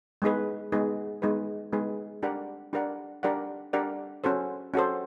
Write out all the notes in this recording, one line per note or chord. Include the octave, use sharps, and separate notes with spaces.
G#3 B3 D#4 G#4 B4
G#3 B3 D#4 G#4 B4
G#3 B3 D#4 G#4 B4
G#3 B3 D#4 G#4 B4
D4 G4 A#4 D5 F#5
D4 G4 A#4 D5 F#5
D4 G4 A#4 D5 F#5
D4 G4 A#4 D5 F#5
C#4 F#4 A4 C5
C#4 F#4 A4 C5